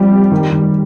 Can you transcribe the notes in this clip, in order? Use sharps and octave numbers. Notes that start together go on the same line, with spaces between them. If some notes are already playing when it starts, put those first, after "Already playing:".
Already playing: F3 G3 C4
C4
D#3
D#3